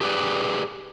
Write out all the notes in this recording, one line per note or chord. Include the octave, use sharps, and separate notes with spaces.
G4 G#4 B4 D5